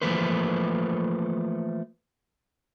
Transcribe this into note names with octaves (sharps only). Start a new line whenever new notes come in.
E3 F3 A3 A#3 B4 C5